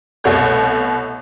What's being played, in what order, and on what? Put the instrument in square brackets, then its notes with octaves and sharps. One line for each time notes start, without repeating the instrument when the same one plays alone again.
[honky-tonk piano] C2 B2 A3 C#5 F#5 G6